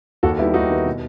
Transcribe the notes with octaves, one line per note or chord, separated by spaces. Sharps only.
D#2 F#4 A4
D#3 G3 B3 E4 G4
D#2 D#4 F#4
D#3 G3 B3
B2